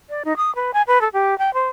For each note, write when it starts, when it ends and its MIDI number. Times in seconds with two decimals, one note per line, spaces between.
0.09 0.23 74
0.25 0.36 63
0.37 0.54 87
0.55 0.71 71
0.73 0.82 80
0.87 1.01 71
1.01 1.08 69
1.13 1.37 67
1.38 1.53 79
1.54 1.68 72